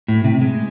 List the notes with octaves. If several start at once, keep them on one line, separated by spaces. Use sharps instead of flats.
A2
C3
G#3